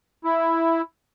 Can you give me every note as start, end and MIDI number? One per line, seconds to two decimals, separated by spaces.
0.24 0.82 64